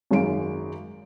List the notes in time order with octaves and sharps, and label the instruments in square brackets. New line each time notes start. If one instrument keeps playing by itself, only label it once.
[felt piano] G#1 F#2 G#3 F5 D7